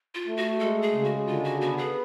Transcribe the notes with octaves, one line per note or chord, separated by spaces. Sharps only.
F4
A3
F#4
G#3 A4
G#4
C#3
F#4
D3 F4
F#4
B3 F#4
G#4